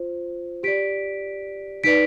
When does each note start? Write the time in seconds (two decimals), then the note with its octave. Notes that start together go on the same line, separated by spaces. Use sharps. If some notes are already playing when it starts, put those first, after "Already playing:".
Already playing: F4 C5
0.63 G4 D5 B6 D7
1.84 D#4 B4 D5 B6 D7